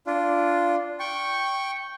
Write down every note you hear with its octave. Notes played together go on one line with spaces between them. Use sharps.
D4 F4
G5 C#6